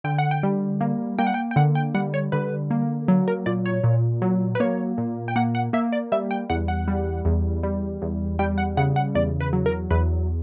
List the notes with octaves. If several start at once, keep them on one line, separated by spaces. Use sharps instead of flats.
D3 G5
F#5
G5
G3
A#3
A#3 G5
F#5
G5
G5
D3 F#5
G5
G3 F#5
C#5
D3 B4
A#3
F#3
A#4
A#2 D5
C#5
A#2
F#3
B4
A#3 C#5
A#2
G5
A#3 F#5
F#5
A#3 E5
D5
G3 E5
G5
E2 F#5
F#5
G3
E2
G3
E2
G3 G5
F#5
C#3 F#5
F#5
E2 D5
B4
F#3
A#4
E2 B4